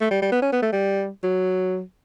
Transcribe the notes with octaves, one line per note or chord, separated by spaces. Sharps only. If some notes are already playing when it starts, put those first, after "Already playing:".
A3
G3
G3
B3
C#4
B3
A3
G3
F#3